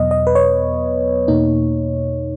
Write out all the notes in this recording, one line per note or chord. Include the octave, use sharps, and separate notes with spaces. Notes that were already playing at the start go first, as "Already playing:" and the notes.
Already playing: E2 B2 F#3 B3 D#5
D#5
B4
C#5
E2 B2 A#3 D#4